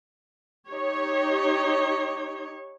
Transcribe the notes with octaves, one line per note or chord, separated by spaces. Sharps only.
D#4 G4 C#5